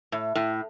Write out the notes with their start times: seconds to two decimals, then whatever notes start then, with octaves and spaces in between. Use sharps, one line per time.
0.12 A2
0.35 A2